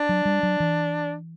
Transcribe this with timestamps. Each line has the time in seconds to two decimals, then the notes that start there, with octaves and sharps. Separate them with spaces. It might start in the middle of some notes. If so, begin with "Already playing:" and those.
Already playing: D4
0.09 F#3
0.25 G3
0.43 F#3
0.60 E3